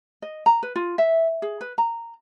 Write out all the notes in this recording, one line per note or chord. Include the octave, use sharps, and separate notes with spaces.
D#5
A#5
B4
F4
E5
G#4
B4
A#5